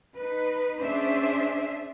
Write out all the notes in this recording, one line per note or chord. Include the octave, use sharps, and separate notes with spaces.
D#4 B4
C#4 D4 G#4 C5 E5